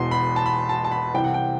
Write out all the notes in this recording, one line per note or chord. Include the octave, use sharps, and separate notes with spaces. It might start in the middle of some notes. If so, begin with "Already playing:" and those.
Already playing: E1 E2 B2 C6
B5
A5
B5
A5
A5
B5
C2 C3 E3 G5
F#5
G5